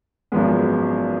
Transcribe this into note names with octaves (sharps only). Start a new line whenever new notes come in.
G#1 F#2 F3 G#3 B3